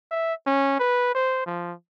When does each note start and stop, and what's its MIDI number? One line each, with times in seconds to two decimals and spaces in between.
0.11 0.33 76
0.46 0.79 61
0.80 1.13 71
1.15 1.42 72
1.47 1.73 53